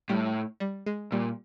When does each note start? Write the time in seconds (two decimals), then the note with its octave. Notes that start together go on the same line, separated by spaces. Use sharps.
0.09 A2 G3
0.60 G3
0.86 G#3
1.12 A#2 G3